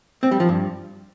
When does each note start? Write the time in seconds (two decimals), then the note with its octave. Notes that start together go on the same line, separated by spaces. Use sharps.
0.23 C4
0.31 G3
0.40 F3
0.49 G2